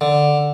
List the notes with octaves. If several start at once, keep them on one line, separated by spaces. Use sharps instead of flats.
D3